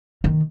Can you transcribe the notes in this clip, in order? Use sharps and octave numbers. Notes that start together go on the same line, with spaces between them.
D#3